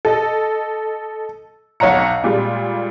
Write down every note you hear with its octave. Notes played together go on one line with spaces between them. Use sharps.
A4 D#5
B1 C#5 F#5 A#5 C#7
A#2 G3 G#3 F4